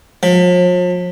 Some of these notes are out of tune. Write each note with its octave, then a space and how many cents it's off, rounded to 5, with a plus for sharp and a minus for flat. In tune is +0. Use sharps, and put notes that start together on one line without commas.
F3 +45